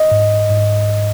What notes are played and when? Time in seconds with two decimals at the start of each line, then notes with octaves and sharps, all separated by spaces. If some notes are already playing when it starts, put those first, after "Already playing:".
Already playing: D#5
0.11 G#2
0.50 G#2